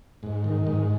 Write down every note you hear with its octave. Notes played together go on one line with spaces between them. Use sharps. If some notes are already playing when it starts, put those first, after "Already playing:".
G#2
D#3
G#2